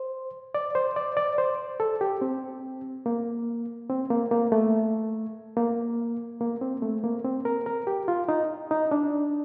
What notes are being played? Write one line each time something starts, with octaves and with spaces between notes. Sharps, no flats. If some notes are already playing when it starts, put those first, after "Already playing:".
Already playing: C5
D5
C5
D5
D5
C5
A4
G4
C4
A#3
C4
A#3
A#3
A3
A#3
A#3
C4
A3
A#3
C4
A#4
A#4
G4
F4
D#4
D#4
D4